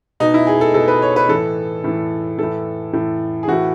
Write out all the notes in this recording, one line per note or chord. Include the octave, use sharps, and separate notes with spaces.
B2 D#4
E4
G#4
A4
B2 A4
B4
C#5
B4
A2 E3 A4
A2 E3
A2 E3 A4
A2 E3
G#4
A2 E3 F#4